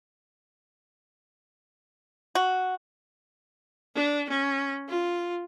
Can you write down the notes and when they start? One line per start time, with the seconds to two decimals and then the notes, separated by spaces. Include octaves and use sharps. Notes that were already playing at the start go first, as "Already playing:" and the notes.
2.35 F#4
3.95 D4
4.29 C#4
4.88 F4